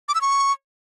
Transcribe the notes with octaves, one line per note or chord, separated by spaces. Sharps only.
D6
E6
C#6